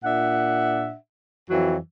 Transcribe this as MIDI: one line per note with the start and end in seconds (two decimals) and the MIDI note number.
0.05 0.93 46
0.05 0.93 62
0.05 0.93 76
0.05 0.93 78
1.50 1.77 41
1.50 1.77 52
1.50 1.77 54